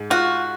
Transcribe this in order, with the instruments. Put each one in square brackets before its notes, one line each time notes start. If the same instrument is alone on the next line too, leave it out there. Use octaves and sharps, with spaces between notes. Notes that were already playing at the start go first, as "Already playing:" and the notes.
Already playing: [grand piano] G#2
[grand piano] F4 [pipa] F#4